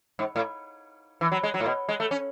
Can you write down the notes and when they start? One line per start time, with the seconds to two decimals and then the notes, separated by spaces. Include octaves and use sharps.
0.19 G#2
0.36 A2
1.21 E3
1.32 F#3
1.43 G#3
1.54 F#3
1.60 A2
1.66 B2
1.89 G#3
2.00 A3
2.11 C#4